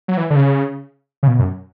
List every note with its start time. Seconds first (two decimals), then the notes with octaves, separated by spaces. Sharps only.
0.08 F#3
0.17 E3
0.30 D3
0.36 C#3
1.23 C#3
1.27 B2
1.39 F#2